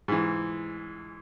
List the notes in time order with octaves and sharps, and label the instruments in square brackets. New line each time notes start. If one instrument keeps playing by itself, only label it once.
[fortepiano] G#2 E3